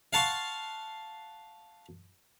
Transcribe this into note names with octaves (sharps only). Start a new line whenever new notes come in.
F5 F#5 A5 C6 C#6